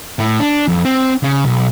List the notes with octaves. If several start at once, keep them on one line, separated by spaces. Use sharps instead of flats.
A2
D4
F2
C4
C#3
B1